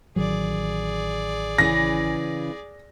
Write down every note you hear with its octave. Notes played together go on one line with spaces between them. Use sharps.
A1 D#3 F#3 G#4 D5
C#3 E3 C#4 A#6